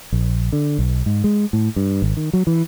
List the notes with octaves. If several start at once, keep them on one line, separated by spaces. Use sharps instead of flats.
A#1
D3
B1
G#2
G#3
A2
G2
G#1
D#3
F#3
E3